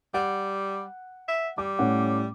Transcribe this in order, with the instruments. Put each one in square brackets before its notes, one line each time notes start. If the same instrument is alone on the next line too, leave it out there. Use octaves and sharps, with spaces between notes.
[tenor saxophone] G3 [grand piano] F#5
[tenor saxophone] E5
[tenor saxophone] G3 [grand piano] D6
[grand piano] A2 C#4 F#5